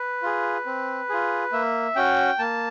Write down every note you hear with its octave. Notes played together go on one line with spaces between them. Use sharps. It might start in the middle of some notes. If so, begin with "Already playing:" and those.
Already playing: B4
F4 G#4
C4
F4 G#4
A#3 E5
C#4 F#4 G5
A#3 A5